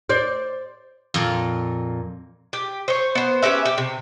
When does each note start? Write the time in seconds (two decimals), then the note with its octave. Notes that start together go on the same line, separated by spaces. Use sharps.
0.09 C5 D5
1.14 F2 A#2
2.53 G4
2.88 C5 C#5
3.15 B3 C5
3.42 C#4 G4 B4 E5
3.66 G4
3.78 C3